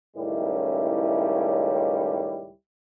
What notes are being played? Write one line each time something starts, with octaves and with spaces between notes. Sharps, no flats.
C#2 A2 D#3 G3 C#4 E4